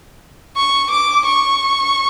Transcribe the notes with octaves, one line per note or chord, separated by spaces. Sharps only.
C#6
D6
C#6